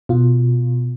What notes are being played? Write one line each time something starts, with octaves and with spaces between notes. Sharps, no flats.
B2 F4